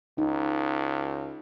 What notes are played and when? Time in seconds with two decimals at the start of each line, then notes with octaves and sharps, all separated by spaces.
0.18 C#2 D#4